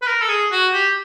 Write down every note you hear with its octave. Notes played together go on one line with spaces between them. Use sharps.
B4
A#4
A4
G#4
F#4
G4